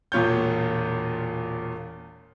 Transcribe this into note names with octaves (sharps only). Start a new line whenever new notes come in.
E1 A#2 F4 C#5 G6